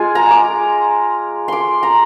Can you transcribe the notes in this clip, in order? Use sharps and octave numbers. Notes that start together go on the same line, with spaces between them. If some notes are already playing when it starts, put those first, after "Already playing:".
Already playing: G#3 F4 G#5
A#5
D6
C6 D6
A#5